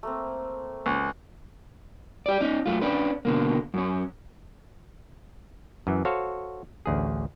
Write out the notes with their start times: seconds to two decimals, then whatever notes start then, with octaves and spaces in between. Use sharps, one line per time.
0.03 A3 A#3 C4
0.86 C#2
2.26 G4 D5
2.41 C#4 D#4
2.66 F#2 A3 F4
2.81 C#4 D4 B4
3.25 B2 D3 A#3
3.74 F#2 C#4
5.87 F#2 E3
6.05 F#4 A4 C5 C#5 F5
6.86 A1 D2 G#4